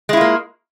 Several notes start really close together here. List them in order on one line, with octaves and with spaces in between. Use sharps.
G#3 E4 F4 A#3